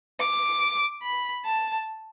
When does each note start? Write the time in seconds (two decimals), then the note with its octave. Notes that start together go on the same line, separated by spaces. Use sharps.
0.20 D6
1.03 B5
1.45 A5